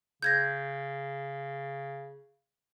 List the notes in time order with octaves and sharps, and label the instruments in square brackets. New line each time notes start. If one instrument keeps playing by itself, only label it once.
[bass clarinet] C#3 [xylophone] G6 G#6 A#6